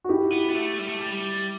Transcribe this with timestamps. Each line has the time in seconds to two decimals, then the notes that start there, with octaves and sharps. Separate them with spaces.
0.04 F#4
0.09 E4 G4
0.32 B3
0.50 B3
0.55 A3
0.79 G3
0.88 A3
1.01 G3
1.12 G3